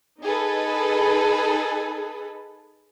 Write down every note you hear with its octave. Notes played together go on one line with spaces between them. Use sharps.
D#4 G#4 A4 B4